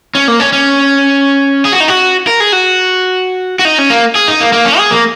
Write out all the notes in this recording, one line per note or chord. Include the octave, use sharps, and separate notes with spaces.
C#4
A#3
C#4
C#4
G#4
F#4
D#4
F#4
A#4
G#4
F#4
F#4
D#4
C#4
A#3
G#4
D#4
A#3
A#3
C#4
G#4
A#3